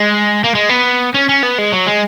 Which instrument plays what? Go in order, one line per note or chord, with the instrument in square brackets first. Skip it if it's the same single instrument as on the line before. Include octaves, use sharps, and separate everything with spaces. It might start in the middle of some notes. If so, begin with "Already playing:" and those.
Already playing: [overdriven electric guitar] G#3
A#3
G#3
B3
C#4
C#4
B3
G#3
F#3
G#3